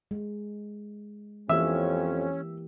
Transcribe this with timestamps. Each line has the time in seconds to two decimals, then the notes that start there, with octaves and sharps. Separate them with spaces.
0.11 G#3
1.49 F2 E3 A#3 C#4 G4 E5